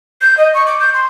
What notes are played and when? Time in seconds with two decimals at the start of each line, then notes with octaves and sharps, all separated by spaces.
0.21 G6
0.37 D#5
0.54 C#6
0.67 D6
0.80 G6
0.94 C6